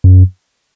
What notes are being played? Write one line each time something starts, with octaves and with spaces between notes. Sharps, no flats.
F#2